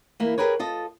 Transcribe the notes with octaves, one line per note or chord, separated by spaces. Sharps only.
E3 A#3 E4
G4 G#4 A#4 B4 C#5
F4 A4 D#5